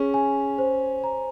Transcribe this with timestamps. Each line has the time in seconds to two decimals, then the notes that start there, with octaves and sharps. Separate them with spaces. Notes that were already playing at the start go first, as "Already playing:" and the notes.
Already playing: C#4 G#4
0.14 G#5
0.58 C5
1.04 A#5